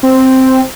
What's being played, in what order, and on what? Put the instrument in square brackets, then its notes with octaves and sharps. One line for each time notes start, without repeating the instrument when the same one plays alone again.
[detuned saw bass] C4